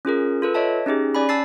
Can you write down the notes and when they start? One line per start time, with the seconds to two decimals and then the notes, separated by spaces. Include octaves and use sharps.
0.05 C#4 F4 G#4 A#4
0.42 F4 A4 B4
0.54 C#5 D#5 E5 A5
0.86 C#4 D#4 G4 G#4
1.15 C#4 D5 G#5 B5
1.29 A5 E6 A6 C7